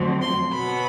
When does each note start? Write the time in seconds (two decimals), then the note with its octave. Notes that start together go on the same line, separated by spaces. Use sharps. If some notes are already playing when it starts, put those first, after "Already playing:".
Already playing: F2 D3 F#3 A3 C4
0.22 C6
0.52 B2 F#3 B3 B5